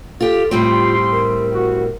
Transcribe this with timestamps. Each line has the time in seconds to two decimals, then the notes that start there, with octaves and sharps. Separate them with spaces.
0.20 F4 G4 A4
0.51 A2 G3 C4 F4 G4 C6
1.12 A#4
1.53 F#4